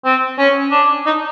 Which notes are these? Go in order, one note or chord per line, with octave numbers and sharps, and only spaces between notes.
C4
C#4
D4
D#4